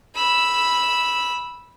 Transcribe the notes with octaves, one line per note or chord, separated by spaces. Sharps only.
B5 E6